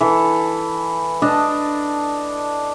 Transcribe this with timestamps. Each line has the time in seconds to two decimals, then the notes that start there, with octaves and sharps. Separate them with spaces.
0.01 E3 A4
1.22 D4 D#5 A5